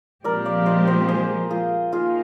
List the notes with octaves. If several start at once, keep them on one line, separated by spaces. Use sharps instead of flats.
A#2 F3 G#3 C4 G4 A#4 D5
D5 F5
C5 D#5
C5 D#5
G#4 C5
F4 G#4
D#3 A#3 D#4 F4 G#4